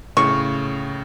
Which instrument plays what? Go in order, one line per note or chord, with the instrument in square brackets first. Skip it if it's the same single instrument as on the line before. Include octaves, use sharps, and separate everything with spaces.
[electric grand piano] A2 C#3 [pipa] C#6